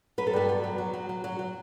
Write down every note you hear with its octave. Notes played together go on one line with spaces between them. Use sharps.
F#3 B4
A4
G2 B3 B4
F#3
F#3
F#3
F#3
F#3
F#3
F#3